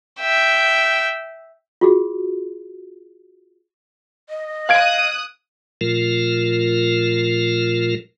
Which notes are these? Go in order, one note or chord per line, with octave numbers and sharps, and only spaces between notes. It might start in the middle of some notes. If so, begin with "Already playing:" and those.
E5 G5
F4 F#4 G#4
D#5
F5 D#6 F#6 G#6 D7
A#2 F3 A3 F4 A#4